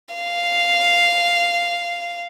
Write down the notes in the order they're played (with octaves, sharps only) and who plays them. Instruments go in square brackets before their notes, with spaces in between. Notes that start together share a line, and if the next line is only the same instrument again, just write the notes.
[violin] F5